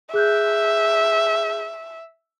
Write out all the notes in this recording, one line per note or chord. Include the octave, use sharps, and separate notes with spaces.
G#4 E5 F#6 G6